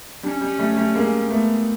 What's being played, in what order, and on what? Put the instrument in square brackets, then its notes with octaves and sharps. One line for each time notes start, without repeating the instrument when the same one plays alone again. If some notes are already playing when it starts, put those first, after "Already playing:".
[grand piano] G3 [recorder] D4
[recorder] C#4
[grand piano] G3
G3 A3
G3 A3
G#3 A#3
A3 B3